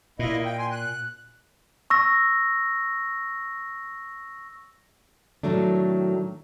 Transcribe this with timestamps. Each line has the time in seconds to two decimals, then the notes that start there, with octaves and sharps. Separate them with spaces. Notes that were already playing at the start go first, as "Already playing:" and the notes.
0.19 A#2 A#3 E4 D#5
0.45 G5
0.59 G#5 C6
0.71 F#6
1.90 C#6 E6 A#6
5.43 A2 D#3 F#3 A3 D4